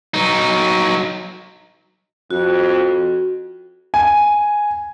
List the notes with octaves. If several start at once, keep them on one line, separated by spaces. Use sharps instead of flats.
F#3 D#4
F2 F#4
G#5